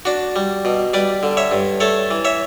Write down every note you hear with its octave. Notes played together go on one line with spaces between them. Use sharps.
D4 F#4
G3
B2
G3 B4 D5
D3
C#5 E5
G2
A3 A4 C#5
E3
C#5 E5